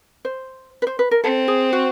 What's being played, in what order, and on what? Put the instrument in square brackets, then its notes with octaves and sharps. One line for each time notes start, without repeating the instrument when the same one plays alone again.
[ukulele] C5
B4
C5
B4
A#4
[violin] C4 [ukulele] A4
[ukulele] G#4
F#4